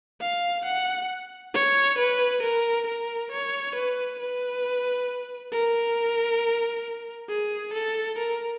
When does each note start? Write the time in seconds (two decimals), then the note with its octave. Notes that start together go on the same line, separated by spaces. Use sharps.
0.21 F5
0.66 F#5
1.54 C#5
1.99 B4
2.42 A#4
2.87 A#4
3.32 C#5
3.75 B4
4.20 B4
5.52 A#4
7.29 G#4
7.74 A4
8.18 A#4